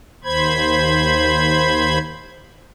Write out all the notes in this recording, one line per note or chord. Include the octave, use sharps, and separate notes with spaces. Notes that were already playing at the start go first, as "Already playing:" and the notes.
D#2 C5 B5 G#6